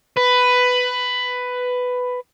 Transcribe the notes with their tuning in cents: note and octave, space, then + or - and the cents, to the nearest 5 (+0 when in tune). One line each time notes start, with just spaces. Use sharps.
B4 +10